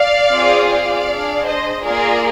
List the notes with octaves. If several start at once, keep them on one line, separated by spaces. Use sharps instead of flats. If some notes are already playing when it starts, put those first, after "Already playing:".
Already playing: D5 F5
C4 F4 G#4
D5 F5
D4 G#4
C5 D#5
A#3 F4 G#4 A#4 D5